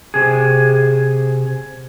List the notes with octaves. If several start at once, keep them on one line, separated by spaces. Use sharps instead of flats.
C3 G#4